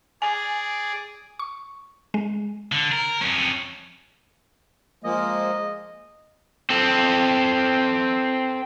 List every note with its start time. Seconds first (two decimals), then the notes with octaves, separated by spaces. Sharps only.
0.22 G#4 D5 G#5
1.39 C#6
2.14 G#3
2.72 D3
2.92 A#4
3.22 F2 C#4
5.04 F3 G#3 A#3 D#5
6.70 C4 A4